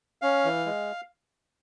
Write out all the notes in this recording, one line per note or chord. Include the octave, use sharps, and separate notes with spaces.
C#4 F5
E3
G#3